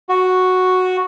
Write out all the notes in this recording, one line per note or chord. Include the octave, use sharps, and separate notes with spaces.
F#4